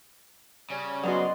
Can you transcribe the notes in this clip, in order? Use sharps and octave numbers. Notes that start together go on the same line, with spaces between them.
C#3 G3 C#4
F#3 B3 F#4 D5 D#5 C6